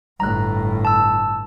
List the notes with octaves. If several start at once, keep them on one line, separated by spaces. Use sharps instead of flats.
G1 A2 A#5 F#6
A5 E6